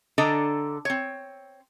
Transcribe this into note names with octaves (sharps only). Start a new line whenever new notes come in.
D3 D4 A4 D#5 A#5
C4 C#5